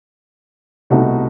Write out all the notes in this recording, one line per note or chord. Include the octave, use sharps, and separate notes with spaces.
C2 B2 A3 D#4 F#4